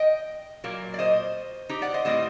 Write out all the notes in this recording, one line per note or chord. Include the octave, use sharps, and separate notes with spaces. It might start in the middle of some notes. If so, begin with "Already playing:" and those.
Already playing: D#5 G5
A#2 F#3 A#3
D5
C5 D#5
D#4 G4
D5 F#5
C5 D#5
A2 G3 C4 C5 D#5